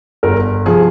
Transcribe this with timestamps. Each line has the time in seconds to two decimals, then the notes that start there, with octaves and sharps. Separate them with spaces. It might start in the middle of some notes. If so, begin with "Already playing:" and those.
0.23 G1 A#4
0.65 C3 F3 G#4